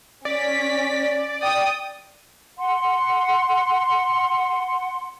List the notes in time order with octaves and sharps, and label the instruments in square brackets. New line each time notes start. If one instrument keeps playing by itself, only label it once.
[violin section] C#4 B6 [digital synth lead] D5
[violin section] G5 D#6
[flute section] F#5 C6